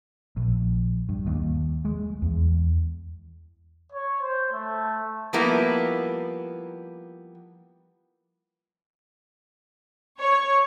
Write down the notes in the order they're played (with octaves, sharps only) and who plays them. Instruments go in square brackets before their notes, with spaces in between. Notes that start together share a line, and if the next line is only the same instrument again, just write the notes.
[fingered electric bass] A#1
G2
D#2
G#3
E2
[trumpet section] C#5
C5
A3
[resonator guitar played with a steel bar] F3 G3 A#3 B3 E4
[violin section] C#5